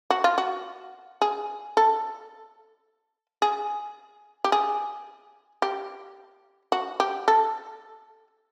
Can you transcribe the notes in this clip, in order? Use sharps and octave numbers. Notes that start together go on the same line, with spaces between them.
F#4
F4
F#4
G#4
A4
G#4
G4
G#4
G4
F#4
G4
A4